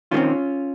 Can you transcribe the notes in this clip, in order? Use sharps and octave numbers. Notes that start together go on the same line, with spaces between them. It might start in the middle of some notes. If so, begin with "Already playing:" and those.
D#3 G3 C#4 F4
C4